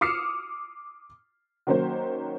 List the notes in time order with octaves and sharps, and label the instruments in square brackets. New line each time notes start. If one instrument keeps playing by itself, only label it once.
[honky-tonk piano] D6 D#6 F6 C7 C#7 E7
D#3 F#3 A#3 C#4 C5